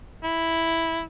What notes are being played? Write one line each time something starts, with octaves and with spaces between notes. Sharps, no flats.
E4